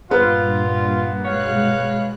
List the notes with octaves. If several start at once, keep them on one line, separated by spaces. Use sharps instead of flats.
G2 A#2 B3 F4
B2 G#3 C#5 F5 F#6